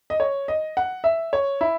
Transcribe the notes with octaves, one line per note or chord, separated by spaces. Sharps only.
D#5
C#5
D#5
F#5
E5
C#5
E4